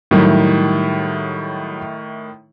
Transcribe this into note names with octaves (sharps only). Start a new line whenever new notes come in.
A2 D#3 F#3 G3 E4